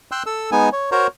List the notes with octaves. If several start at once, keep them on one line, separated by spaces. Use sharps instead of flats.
G5 C6 E6 F#6
A4 E6
G#3 B3 D#4 G#5
C#5
F#4 A#4 C5 C#5 A#5